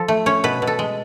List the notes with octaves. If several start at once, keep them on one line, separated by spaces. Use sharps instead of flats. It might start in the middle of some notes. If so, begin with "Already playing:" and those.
Already playing: F3 A4
A3
C#4 C#5
B2 B4
B2
A4
G#3